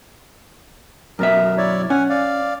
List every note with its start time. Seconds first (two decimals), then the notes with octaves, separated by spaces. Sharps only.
1.19 F#2 B2 A#4 E5
1.58 E4 C#5 D5
1.90 C#4 F#5 G#5
2.09 D5 F5